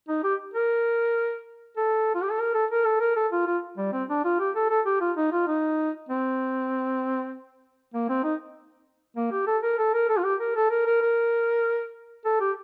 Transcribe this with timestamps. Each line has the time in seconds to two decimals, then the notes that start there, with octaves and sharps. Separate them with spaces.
0.09 D#4
0.24 G4
0.54 A#4
1.77 A4
2.15 F4
2.23 G4
2.30 A4
2.40 A#4
2.54 A4
2.71 A#4
2.85 A4
3.00 A#4
3.16 A4
3.32 F4
3.46 F4
3.77 G3
3.93 C4
4.09 D4
4.24 F4
4.39 G4
4.55 A4
4.70 A4
4.86 G4
5.01 F4
5.17 D#4
5.32 F4
5.48 D#4
6.09 C4
7.94 A#3
8.09 C4
8.24 D#4
9.16 A#3
9.32 G4
9.47 A4
9.63 A#4
9.78 A4
9.94 A#4
10.09 A4
10.17 F4
10.24 G4
10.40 A#4
10.56 A4
10.71 A#4
10.86 A#4
11.01 A#4
12.25 A4
12.40 G4